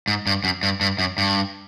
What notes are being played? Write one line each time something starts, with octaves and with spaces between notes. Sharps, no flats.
G#2
G2
F#2
G2
G2
F#2
G2